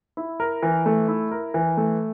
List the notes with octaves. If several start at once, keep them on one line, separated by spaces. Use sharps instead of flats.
E4
A#4
E3
A3
E4
A#4
E3
A3